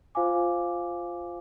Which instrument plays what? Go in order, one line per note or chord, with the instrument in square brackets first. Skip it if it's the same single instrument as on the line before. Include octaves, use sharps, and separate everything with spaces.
[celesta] F4 C5 F5 G#5 D6